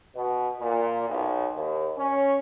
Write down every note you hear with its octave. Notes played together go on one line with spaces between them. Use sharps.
B2
A#2
B1
D#2
C#4